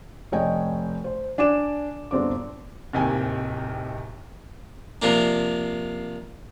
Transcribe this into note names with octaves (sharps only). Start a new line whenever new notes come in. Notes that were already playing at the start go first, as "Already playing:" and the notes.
F1 C#5 D#5 G5 G#5
C5
D4 G#5 D6 E7
G1 C4 D4 D6
D1 D#2 C3 D#3 G5 G#5
C3 F3 A#3 D4